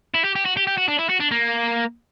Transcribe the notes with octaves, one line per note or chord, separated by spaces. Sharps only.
E4
G4
G4
F#4
G4
G4
F#4
D4
E4
F#4
D4
A#3